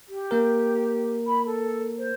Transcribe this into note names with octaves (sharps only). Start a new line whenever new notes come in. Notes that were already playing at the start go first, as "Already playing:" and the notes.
G4
A#3 A#4
B5
A4
C5